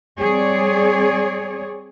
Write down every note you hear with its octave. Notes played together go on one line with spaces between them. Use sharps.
G3 C4 G#4 C#5 D5